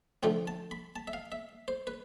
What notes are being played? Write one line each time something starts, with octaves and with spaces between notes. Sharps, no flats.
D3 F3 A3 C4 G5
A5
B5
A5
E5
F5
E5
C5
B4